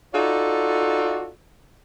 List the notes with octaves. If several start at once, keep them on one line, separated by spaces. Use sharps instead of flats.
D#4 F4 F#4 A4 D5